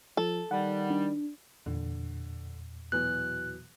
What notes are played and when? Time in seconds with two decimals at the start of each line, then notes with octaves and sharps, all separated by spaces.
0.17 F3 A4
0.51 D#3 G3 F#5
0.90 D4
1.66 E2 A#2 D3
2.92 B2 E3 F#3 F#6